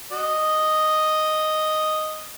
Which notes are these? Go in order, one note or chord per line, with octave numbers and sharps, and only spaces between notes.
F#4 D#5